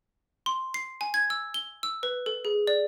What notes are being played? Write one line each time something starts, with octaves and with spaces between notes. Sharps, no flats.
C6
C7
G#5
G#6
E6
G7
E6
B4
A4
G#4
D5